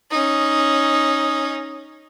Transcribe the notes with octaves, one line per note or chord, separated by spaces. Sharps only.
C#4 D#4